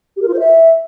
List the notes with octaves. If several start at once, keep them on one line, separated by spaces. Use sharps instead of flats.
G4
A#4
F4
C5
E5